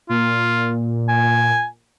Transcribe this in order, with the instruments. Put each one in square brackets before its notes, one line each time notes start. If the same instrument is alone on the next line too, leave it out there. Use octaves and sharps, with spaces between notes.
[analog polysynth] A#2 [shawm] F4
[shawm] G#5